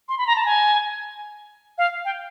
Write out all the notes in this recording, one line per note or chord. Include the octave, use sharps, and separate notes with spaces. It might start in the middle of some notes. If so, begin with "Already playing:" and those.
C6
B5
A#5
A5
G#5
F5
G5